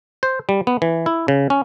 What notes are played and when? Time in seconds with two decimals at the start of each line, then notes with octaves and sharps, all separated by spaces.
0.23 C5
0.49 G3
0.67 B3
0.82 E3
1.06 E4
1.28 C#3
1.50 C#4